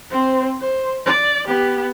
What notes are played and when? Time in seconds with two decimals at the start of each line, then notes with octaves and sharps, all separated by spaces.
0.11 C4 C5
0.61 C5
1.06 D5
1.47 B3 G4